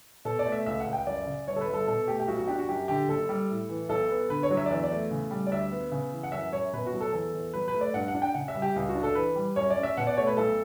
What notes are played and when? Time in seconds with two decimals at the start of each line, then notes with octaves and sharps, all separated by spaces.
0.25 B2 A4
0.39 D5
0.46 A3
0.52 E5
0.66 C#2 E5
0.80 F#5
0.86 C#2
0.93 G5
1.07 F#2 D5
1.26 C#3
1.47 G1 C#5
1.56 A4
1.61 B4
1.68 G1
1.74 A4
1.87 B2 A4
2.07 A3 G4
2.20 G4
2.28 B1 F#4
2.38 F#4
2.47 D4 G4
2.58 F#4
2.69 F#2 G4
2.88 D3 G4
3.08 F#1 A4
3.29 G3
3.49 A2
3.69 E3
3.89 B1 A4
4.09 B3
4.30 D3 B4
4.43 C#5
4.51 F#3
4.57 E5
4.66 D5
4.70 E2 E5
4.84 D5
4.91 A3
5.11 C#3
5.31 G3
5.47 D5
5.51 D2 E5
5.72 B3
5.91 C#3
6.12 E3
6.23 F#5
6.32 F#2 E5
6.52 F#2 C#5
6.73 B2 B4
6.86 F#4
6.93 F#3
7.01 A4
7.13 E2 A4
7.34 E2
7.53 F#3 B4
7.68 B4
7.74 A3
7.81 D5
7.94 G2 F#5
8.08 F#5
8.14 D4
8.22 G5
8.35 C#3 F#5
8.48 E5
8.55 G3
8.62 G4
8.76 C#2
8.89 F#4
8.95 D4
9.03 A4
9.15 E3 B4
9.36 G3
9.56 F#2 C#5
9.70 D5
9.76 C#4
9.83 E5
9.97 B2 F#5
10.07 D5
10.17 A3 C#5
10.27 B4
10.37 B1 A4